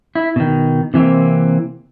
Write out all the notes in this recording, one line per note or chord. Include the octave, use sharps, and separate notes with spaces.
E4
B2 D#3
C3 E3 A#3 C4